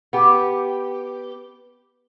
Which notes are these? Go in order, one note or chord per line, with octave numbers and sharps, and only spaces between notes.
B3 G4